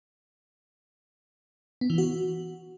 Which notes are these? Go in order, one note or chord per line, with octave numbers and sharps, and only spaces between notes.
B3
E3
F#4